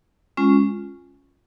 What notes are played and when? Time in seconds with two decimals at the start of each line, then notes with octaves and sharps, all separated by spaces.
0.37 G#3 C#4 F4